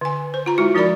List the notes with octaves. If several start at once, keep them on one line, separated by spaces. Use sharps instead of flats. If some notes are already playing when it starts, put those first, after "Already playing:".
D3 G#5
C5
F4 A#5
G#3 E4 F#4
F3 D#4 A#4 D5 B5